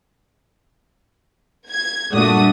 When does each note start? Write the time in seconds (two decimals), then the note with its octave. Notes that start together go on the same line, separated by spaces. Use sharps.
1.69 G#6
2.12 G2 A#2 A3 D4 F#4 D#6